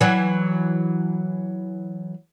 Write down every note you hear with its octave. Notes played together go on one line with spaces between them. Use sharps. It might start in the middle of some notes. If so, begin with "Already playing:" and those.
E3 F#3